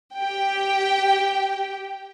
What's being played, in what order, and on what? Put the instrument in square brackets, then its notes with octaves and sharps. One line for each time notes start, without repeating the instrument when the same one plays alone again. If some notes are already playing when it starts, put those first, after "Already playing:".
[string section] G4 G5